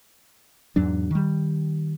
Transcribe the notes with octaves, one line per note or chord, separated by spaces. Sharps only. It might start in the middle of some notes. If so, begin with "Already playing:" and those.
E2 G#2 F#3 D4
D#3 G3